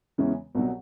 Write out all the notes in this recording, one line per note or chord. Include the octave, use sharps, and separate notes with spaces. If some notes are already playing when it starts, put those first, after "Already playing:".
E2 C#3 E3 G#3 C#4
C2 B2 F#3